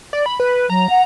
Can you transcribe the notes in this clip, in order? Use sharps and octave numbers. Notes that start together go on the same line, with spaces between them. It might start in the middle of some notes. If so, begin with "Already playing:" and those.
D5
B5
B4
F#3 A#5
F#5